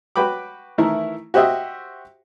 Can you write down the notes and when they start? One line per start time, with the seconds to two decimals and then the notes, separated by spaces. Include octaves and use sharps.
0.16 F#4 B4 G5 B5 D6
0.78 D#3 E3 A3 E4 A#4
1.34 F#4 G4 C5 D#5 E5